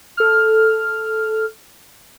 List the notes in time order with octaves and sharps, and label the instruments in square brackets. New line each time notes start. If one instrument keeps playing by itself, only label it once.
[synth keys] A4 F6